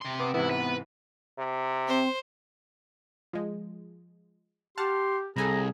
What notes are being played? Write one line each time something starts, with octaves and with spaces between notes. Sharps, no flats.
C3 C6
B3 D6
G#2 C3 E3 B3 E4
B4
C3
C4 C5
F3 G#3
G4 F#5 A5 C6 F6
C2 G#4 A4 G#5 A#5 B5